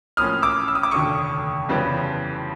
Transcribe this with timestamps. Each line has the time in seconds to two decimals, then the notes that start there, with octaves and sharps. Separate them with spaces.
0.17 A1 A2 F3 A#3 C#4 D#6 F6
0.42 D6 E6
0.68 E6
0.75 D#6
0.83 D6
0.91 F1 D#2 D3 C#6 D#6
1.69 F2 C#3 E3 G3 B3